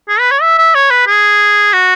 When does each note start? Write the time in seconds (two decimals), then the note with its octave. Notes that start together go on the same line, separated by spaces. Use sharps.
0.09 G#4
0.19 B4
0.31 C#5
0.42 E5
0.58 E5
0.75 C#5
0.91 B4
1.07 G#4
1.73 F#4